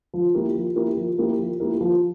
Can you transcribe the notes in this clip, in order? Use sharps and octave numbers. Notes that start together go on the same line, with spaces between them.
F3
A#3 E4 G4 A#4
F3
A#3 E4 G4 A#4
F3
A#3 E4 G4 A#4
F3
A#3 E4 G4 A#4
F3